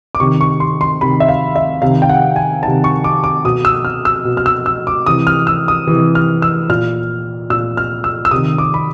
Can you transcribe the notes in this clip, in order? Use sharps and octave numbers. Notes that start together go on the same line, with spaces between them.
D6
C3 D#3 C#6
C#6
C6
C6
C3 D#3 B5
E5
F5
E5
C3 D#3 F5
G5
F#5
G#5
C3 D#3 A5
C#6
D6
D6
B2 D#6
E6
F6
E6
B2
F6
E6
E6
D6
C3 E3 D#6
F6
E6
D#6
C3 E3
F6
E6
A#2 F6
A#2 E6
F6
E6
E6
C3 D#3 D#6
D6
B5